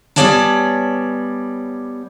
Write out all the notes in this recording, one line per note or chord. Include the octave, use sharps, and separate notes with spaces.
G3 B3 C#5 D5 G#5 A5